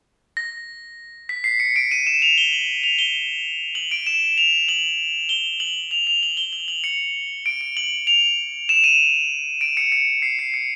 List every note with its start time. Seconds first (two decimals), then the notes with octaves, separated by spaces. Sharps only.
0.37 A#6
1.29 B6
1.44 C7
1.60 C#7
1.76 D7
1.91 D#7
2.07 E7
2.22 F7
2.38 G7
2.53 F#7
2.83 F7
2.99 G7
3.75 F#7
3.91 D7
4.07 E7
4.38 F7
4.69 F#7
5.29 G7
5.60 F#7
5.91 F7
6.07 F7
6.23 F#7
6.37 G7
6.53 F#7
6.68 F#7
6.84 C#7
7.46 D7
7.61 D7
7.77 F#7
8.07 F7
8.69 E7
8.84 D#7
9.61 D7
9.77 C#7
9.92 C#7
10.22 C7
10.39 C7
10.54 C#7